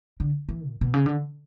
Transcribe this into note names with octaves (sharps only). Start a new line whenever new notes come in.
D3
E3
A#2
B2
C#3
D3